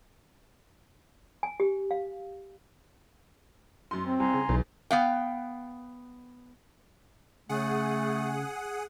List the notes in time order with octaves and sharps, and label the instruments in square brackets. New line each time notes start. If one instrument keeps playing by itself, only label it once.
[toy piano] G#5
G4
F5
[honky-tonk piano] F#2 C6
[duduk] C4
[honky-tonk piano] C2 [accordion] G#5 A#5 C6
[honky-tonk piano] C#3
[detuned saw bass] B1 [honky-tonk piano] E2
[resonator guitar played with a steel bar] B3 F5 G5
[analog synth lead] C#3 [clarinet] A3 [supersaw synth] G#4 F#5 D#6